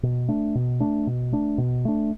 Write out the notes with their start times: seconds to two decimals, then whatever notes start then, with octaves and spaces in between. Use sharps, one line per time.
0.03 B2
0.28 A3 D4
0.55 B2
0.80 A3 D4
1.07 B2
1.32 A3 D4
1.58 B2
1.85 A3 D4